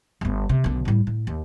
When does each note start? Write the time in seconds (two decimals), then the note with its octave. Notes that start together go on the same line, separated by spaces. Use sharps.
0.21 G1 B3
0.49 C3
0.64 B1 D3
0.85 A2 G3
1.07 A2
1.27 D#2